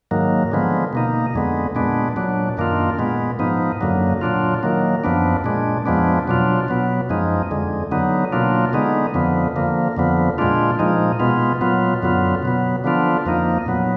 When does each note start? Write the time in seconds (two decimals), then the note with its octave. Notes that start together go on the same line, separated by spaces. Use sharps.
0.11 G#2 D#3 F#3 A#3
0.52 D3 F3 G#3 B3
0.93 B2 A#3 D#4
1.34 F2 D3 G#3 B3
1.75 A#2 G#3 B3 D4
2.16 A#2 F#3 D4
2.57 F#2 D#3 A#3 D4 F4
2.99 A#2 G#3 B3
3.39 G#2 F3 B3 D#4
3.81 F#2 D3 F#3 A#3
4.21 A#2 F#3 D4 F4
4.63 D#3 F#3 A#3
5.04 F#2 F3 B3 D4
5.44 A#2 G#3 D4
5.86 F2 F3 G#3 B3 D4
6.27 B2 F#3 D4 F4
6.68 B2 F#3 B3
7.09 F#2 F3 G#3 D#4
7.51 F2 D3 G#3
7.91 D3 F#3 B3 D#4
8.32 B2 F#3 A#3 D4 F4
8.73 D3 G#3 B3 D#4
9.14 F2 D3 F3 B3
9.56 D3 F3 A#3
9.97 F2 D3 F3 B3
10.38 A#2 G#3 D4 F4
10.79 A#2 F3 G#3 D#4
11.19 B2 G#3 B3 F4
11.61 A#2 F#3 B3 F4
12.02 F#2 D3 F#3 B3 F4
12.43 B2 F#3 B3
12.84 D3 F3 B3 D4 F4
13.26 F2 F3 A#3 D#4
13.66 A#2 F#3 B3